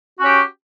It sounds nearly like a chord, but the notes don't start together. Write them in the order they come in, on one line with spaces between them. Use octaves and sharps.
F#4 C#4 G4